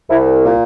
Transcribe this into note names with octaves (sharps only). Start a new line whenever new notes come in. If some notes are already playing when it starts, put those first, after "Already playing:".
C2 E4
A#2